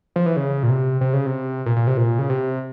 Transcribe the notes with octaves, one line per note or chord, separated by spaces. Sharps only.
F3
E3
C#3
A#2
C3
C3
C#3
C3
A#2
A#2
C3
A#2
C#3
C3